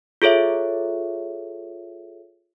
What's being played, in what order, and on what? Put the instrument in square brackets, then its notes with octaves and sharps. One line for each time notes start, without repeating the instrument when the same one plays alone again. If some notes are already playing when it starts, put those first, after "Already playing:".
[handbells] F4 G#4 A4 C#5 E5